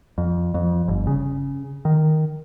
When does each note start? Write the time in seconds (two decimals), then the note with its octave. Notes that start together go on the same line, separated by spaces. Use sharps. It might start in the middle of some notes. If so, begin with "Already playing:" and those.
0.18 F2
0.54 F2
0.88 G1
1.07 C#3
1.85 D#3